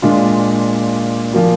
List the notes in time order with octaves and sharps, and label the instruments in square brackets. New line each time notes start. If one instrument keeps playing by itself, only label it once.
[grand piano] A#2 G#3 D4 F4
A#2 F3 A#3 F4